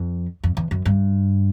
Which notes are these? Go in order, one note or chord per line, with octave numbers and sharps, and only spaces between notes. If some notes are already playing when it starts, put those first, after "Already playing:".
Already playing: F2
F2
E2
F#2
G2